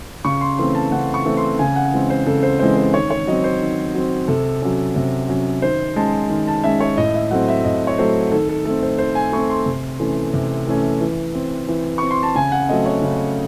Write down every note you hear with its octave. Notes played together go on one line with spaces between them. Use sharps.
C#3 C#6
C6
E3 A3 C4 C6
A5
C#3 F#5
C#6
E3 A3 C4
C6
C#3 G#5
F#5
E3 G#3 C4
C5
C#3 A4
C5
E3 G#3 C4 C5
C5
D#3 C#5
C#5
F#3 C4 D#5
C5
D#3
F#3 C4
C3 A4
F#3 C#4
C3
F#3 C#4
D#3 C5
G#3 C#4 A5
D#3
A5
G#3 C#4 E5
C#5
A2 D#5
E5
F#3 A3 C4 F#5
E5
A2 D#5
C#5
F#3 A3 C4 C5
D#3 A4
A4
A3 C4 A4
C5
D#3 C5
G#5
A3 C4 C#6
C6
C3
E3 A3 C#4
C3
E3 A3 C#4
E3
C4
E3
C4 C#6
C6
A5
C#3 G#5
F#5
F#3 A3 C4 D#5
C#5
C#3